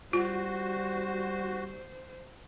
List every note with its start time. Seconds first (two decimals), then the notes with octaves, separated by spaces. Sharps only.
0.13 G3 F4 F#4 C5